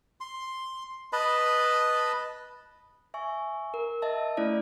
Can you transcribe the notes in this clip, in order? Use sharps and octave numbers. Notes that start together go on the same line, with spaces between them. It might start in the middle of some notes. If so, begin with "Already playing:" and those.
C6
B4 D#5 A5 B5
E5 G#5 C#6
A#4
D#5 E5 A5
A3 C#4 E4 D5